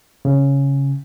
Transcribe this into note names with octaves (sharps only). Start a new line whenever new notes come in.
C#3